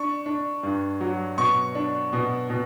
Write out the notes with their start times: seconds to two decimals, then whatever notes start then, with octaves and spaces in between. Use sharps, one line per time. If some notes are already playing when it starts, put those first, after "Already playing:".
Already playing: D4 C#6
0.26 D4
0.63 G2
1.01 F#3
1.38 B2 C#6
1.75 D4
2.13 B2
2.50 B2